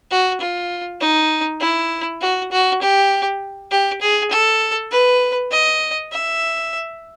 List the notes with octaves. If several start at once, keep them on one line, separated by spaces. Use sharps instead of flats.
F#4
F4
D#4
E4
F#4
F#4
G4
G4
G#4
A4
B4
D#5
E5